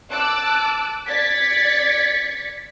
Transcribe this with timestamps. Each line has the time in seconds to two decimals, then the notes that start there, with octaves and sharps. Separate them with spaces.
0.10 A5 D6 E6 F#6
1.08 D5 G#6 A6 B6 C#7